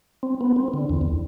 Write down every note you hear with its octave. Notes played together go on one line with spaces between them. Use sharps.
C4
B3
C4
D3
E2
E2